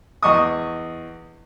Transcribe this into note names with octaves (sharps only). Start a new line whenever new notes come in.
E2 D#5 C#6 D#6